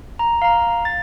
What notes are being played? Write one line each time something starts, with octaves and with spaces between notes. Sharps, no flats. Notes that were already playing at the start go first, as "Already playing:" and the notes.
A#5
F5 A#5
A6